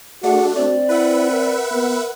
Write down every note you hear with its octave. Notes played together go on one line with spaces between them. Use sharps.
A3 D4 F#4 G#4 F#5
C4 F#4 D5
E4 B4 E5 F#5
A#4
B3 A#4